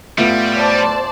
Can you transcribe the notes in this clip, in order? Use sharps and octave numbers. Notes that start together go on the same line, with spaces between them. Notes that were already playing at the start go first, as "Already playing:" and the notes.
A2 G3 B3 F4 E5
C5 D5 A5